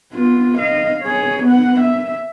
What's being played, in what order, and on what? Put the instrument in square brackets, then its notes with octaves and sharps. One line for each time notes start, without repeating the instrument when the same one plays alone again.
[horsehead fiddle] B3 F4
D#5 F5
G#4 C#5
B3 F#5
E5